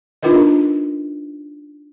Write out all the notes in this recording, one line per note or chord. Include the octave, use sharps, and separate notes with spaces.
D4 D#4 F4 A#4 B4 D#5